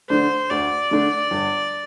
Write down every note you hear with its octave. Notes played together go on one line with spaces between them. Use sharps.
D3 A3 D4 C5
D2 D5
D3 A3 D4
G1